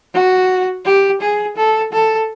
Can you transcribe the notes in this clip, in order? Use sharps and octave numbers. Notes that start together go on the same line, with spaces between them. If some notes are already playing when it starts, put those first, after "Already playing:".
F#4
G4
G#4
A4
A4